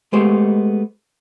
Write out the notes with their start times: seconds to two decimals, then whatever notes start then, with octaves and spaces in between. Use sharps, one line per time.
0.13 G#3 A3 B3 G4 C5